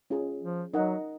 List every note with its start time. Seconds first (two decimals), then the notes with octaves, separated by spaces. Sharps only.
0.10 C#4 F4 G#4
0.41 F3
0.73 F#3 D#4 A#4 D#5 F#5